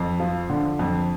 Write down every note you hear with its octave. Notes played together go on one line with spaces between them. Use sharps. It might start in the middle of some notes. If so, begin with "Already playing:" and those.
Already playing: F2
F3
D3
F2